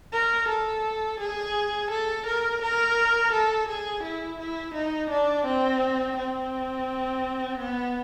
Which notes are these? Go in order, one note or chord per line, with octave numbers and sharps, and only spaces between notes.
A#4
A4
G#4
A4
A#4
A#4
A4
G#4
E4
E4
D#4
D4
C4
C4
B3